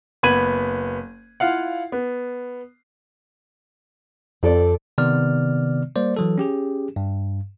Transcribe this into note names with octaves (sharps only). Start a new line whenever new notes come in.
F#1 B3 B5 G#6 D#7 F#7
E4 F4 F5 F#5
B3
F2 C4 A4 D5
C3 D#3 B3 D5 F6
G3 A#3 C5 D5
E3 F#3 A4
C#4 G4 G#4
G2